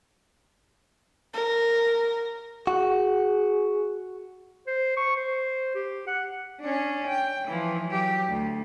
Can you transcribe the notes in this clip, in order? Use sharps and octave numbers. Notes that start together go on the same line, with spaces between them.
A#4
F#4 G#4
C5
C#6
C5
G4
F#5
C#4 D4
G5
E3 F3
F#3 G4
D2